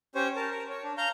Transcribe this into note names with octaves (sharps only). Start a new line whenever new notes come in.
C#4 G4 C5 C#5
A#4 A5
A#4
C#5
D4
F5 A#5 F6 G6